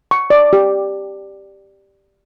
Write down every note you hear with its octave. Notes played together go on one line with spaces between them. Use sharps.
C#6
D5
G4